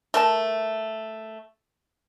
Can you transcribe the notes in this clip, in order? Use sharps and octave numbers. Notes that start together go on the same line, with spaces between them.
A3 A#4 A5